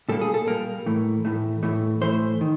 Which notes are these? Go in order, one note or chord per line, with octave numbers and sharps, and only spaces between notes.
A#2 G3 A#3 A4
G#4
A4
A#2 G3 A#3 A#4
A2 E3 A3
A2 E3 A3
A2 E3 A3
A2 E3 A3 C5
D#3